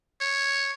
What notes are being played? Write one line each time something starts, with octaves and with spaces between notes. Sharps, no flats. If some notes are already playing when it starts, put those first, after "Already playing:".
C#5